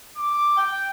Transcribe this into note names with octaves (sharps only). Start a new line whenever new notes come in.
D6
G5